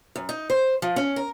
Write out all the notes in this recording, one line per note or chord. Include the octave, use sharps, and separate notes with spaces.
F#2
D#4
C5
F3
C#4
A#4